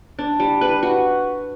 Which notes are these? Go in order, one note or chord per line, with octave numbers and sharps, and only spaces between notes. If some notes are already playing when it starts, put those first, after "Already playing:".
D4
G3
B4
F#4